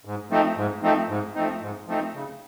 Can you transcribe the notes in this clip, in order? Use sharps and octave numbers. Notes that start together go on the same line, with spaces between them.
G#2
F3 A3 C4 D#4
G#2
F3 A3 C4 D#4
G#2
F3 A3 C4 D#4
G#2
F3 A3 C4 D#4
C#3